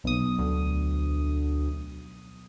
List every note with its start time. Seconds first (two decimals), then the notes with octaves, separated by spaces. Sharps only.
0.04 B1 D#6
0.39 D2